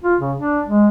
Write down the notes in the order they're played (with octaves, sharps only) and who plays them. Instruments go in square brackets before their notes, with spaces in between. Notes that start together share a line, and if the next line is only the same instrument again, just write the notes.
[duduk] F4
C#3
D4
G#3